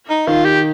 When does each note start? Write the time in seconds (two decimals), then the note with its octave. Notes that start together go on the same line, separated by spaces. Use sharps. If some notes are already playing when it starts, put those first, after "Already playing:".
0.10 D#4
0.27 D#3 F4
0.45 G4